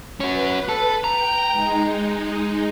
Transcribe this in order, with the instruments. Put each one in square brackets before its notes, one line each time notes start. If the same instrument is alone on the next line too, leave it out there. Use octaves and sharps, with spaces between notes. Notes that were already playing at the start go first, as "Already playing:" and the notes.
[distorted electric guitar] C#4 F#4 [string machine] B4
[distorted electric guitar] A4
[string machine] G5 [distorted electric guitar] A#5
[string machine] G#3 D#4